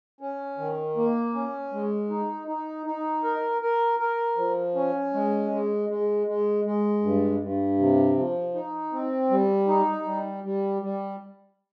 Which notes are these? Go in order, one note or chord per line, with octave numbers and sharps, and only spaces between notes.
C#4
D#3
A#3
C#4
G#3
D#4
D#4
D#4
A#4
A#4
A#4
F3
C#4
G#3
G#3
G#3
G#3
G#3
G2
G2
C3
F3
D#4
C4
G3
D#4
G3
G3
G3